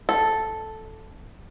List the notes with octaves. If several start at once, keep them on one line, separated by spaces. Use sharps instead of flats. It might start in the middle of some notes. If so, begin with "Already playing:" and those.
A4